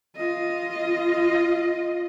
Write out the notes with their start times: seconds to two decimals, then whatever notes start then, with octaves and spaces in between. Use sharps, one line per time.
0.16 F4 D#5